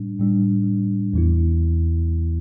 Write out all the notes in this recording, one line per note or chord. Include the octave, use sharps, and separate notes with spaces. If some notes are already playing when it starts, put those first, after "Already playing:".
Already playing: A2 G3 D4
A2 G3 D4
E2 E3 B3 E4